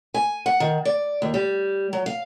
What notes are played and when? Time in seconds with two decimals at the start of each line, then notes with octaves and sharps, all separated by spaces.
0.14 G#5
0.46 F#5
0.60 D#3
0.85 D5
1.22 D#2
1.34 G3
1.93 F#3
2.06 F5